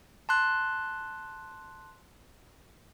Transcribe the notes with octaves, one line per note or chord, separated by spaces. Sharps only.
A5 C6 F#6